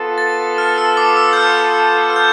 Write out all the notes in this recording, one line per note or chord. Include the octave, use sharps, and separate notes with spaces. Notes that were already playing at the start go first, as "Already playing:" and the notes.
Already playing: B3 F4 A4
A6
F6
E6
D6
E6
G6
F6
F6
G6